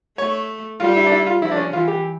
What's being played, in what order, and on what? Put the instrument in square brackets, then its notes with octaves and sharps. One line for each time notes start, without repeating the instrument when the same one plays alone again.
[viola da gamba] A3 [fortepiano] C#5
[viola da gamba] G3 [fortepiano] F4
[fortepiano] E4
D4
E4
F4
[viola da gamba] F3 [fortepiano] E4
[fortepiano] D4
C#4
[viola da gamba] E3 [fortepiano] F4
[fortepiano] G4